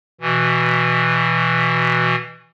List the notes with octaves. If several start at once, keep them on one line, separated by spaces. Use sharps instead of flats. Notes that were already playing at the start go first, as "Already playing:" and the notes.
B2 E3